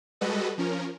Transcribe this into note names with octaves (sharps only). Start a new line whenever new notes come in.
G3 G#3 F#4 A4 B4 D#5
F3 C#4 A#4